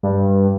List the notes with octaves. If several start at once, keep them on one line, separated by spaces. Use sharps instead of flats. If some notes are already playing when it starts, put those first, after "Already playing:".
G2